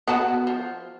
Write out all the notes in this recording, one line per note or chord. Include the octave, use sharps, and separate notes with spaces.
B3 F#4 A5
F3